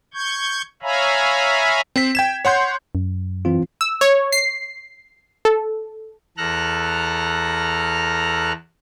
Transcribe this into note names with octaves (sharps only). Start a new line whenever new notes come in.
C#6 G6 G#6
C#5 E5 F5 G#5 A#5 B5
C4 C5 B6
G5 G#6 E7
C#5 F#5 C6 G6
F#2
E3 C4 F4
E6
C#5
C7
A4
E2 A4 A#5 F6 F#6